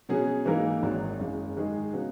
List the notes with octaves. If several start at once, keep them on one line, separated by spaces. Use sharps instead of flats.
B2 F#3 C#4 G#4
G#2 E3 A#3 D#4 A#4
G#1 G#2 D#3 F#3
F#1 F#2 C#3 G#3
G#2 D#3 G#3 D#4 G#4
C#3 F#3 B3 D#4